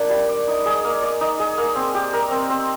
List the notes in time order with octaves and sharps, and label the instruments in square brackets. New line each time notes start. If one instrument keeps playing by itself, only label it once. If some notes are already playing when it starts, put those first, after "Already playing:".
Already playing: [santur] A#3 D4
G3
D5
D#4
G#4
A#3
D5
D#4
G#4
A#3
C4
G4
A#4
C4
C4